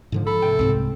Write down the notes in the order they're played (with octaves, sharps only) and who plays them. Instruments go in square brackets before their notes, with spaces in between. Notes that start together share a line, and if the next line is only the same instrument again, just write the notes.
[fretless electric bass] G#2 D3 F3
[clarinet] A4 [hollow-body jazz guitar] B5
[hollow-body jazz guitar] C3 G5
[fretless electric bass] C2 G#2 C3 [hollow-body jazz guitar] C4